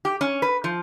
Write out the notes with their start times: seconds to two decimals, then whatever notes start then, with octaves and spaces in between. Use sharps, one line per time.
0.05 G4
0.21 C#4
0.42 B4
0.64 F3